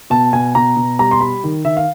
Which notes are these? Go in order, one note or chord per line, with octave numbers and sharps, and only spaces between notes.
B2 A5
B2 G#5
B2 A#5
B2
G3 A#5
C6
G3 B5
D#3
D#3 E5
F5